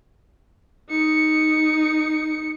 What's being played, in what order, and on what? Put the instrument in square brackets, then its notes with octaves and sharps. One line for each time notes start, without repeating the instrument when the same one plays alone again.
[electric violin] D#4 C#7